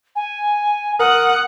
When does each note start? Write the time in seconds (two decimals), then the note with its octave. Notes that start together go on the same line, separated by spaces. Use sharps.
0.16 G#5
0.99 A#4 F#5 D#6